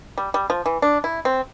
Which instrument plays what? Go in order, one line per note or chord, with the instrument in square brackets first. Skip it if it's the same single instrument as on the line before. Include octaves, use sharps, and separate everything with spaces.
[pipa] G3
G3
F3
E3
D4
E4
C4